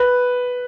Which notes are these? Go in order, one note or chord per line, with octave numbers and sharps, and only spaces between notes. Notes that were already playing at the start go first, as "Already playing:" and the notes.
Already playing: B4